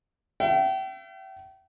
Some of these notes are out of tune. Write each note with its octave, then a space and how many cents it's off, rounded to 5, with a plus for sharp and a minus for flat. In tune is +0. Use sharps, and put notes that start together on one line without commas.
E5 +40 G5 -35